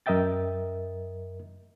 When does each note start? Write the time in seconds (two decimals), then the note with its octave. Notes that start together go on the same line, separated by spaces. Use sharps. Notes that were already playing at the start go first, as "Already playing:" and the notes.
0.06 F#2 A#4 D#5 E5 G5 A6